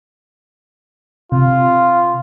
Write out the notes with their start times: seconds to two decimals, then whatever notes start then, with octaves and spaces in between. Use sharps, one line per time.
1.32 C3 F4